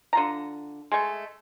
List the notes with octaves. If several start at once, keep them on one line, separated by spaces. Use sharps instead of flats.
D3 F4 A#5
G#3 A3